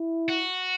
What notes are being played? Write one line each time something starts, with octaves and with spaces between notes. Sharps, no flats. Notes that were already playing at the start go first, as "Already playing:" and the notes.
Already playing: E4
F#4